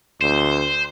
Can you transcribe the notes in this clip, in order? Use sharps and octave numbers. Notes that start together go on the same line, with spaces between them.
D2 C5